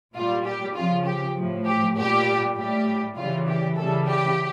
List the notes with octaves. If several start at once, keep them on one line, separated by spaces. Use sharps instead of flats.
A#2 G3 F4
G4
C#3 F3 F4
G4
A2 F3
G4
A#2 G3 G4
A2 G3 G4
C#3 E3 G3 F4
G4
C#3 E3 G3 A4
G4